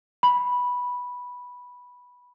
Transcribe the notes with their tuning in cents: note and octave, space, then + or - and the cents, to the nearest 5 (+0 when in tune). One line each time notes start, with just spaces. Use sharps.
B5 -5